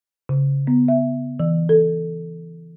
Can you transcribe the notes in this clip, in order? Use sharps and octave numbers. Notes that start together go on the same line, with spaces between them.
C#3
B3
E5
E3
A4